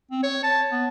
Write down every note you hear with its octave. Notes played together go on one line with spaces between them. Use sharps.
C4
C#5
A5
B3